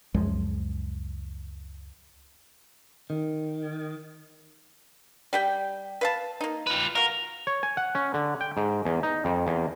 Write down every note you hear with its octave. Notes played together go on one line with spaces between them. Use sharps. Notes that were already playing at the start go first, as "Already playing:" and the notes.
C#2 F#2 F3 G#3
D#3
G3 G4 G5
B4 F5 A5
A#3 D#4
F4 B4
F#4 A#4 F5
C#5
G#5
F#5
C#4
D3
G5
G#2
E2
D#4
F2
E2